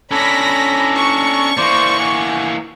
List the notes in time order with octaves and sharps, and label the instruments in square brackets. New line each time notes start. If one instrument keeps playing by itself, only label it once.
[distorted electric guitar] C#4 D4 [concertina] A4 A#5 [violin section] B5 A#6 B6
[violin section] C#6
[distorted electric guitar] E3 A#3 [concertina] C5 D5
[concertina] F#5 G#5